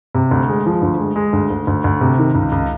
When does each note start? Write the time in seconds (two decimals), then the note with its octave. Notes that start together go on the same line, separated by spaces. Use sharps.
0.15 C3
0.31 D2
0.49 G#3
0.66 F3
0.82 D2
0.99 G#3
1.16 G#3
1.33 D2
1.50 D2
1.67 D2
1.84 D2
2.01 C3
2.18 D#3
2.35 C#2
2.52 C#2